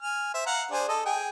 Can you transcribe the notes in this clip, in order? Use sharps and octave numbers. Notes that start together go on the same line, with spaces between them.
G#5 F6
C5 E5
F5 F#5 A#5
D4 G#4 C5
A4 D#5
G#4 G5